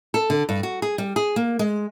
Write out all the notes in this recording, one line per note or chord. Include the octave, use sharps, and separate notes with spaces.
A4
D3
G2
F#4
G#4
G3
G#4
A#3
G#3